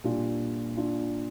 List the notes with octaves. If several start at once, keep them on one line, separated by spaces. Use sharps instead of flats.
A#2 G3 D4 F4
D4 F4